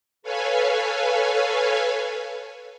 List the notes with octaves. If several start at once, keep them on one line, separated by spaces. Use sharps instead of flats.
A4 B4 C#5 F5 G#5